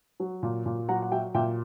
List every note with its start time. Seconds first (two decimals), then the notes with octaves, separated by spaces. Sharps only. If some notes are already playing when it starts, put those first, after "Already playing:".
0.20 F#3
0.43 A#2
0.66 A#2
0.88 F#3 F#5 A#5
1.02 F#5
1.12 F#3 E5 G5
1.34 A#2 E5 G5